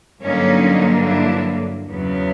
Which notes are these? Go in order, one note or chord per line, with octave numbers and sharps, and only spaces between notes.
G2 D3 F#3 A#3 C#4 D#4
D4 E4
E2 C#3 F#3 B3